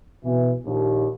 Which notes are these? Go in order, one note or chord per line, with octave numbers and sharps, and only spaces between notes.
B2 E3
A#1 D#2